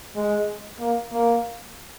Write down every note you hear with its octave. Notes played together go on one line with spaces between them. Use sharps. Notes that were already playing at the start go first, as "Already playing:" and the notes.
G#3
A#3
A#3